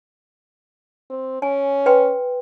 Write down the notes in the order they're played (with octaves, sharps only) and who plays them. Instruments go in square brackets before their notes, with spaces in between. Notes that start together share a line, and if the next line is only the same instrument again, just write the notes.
[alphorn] C4
[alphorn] C#4 [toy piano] G#5
[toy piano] B4 G5 C6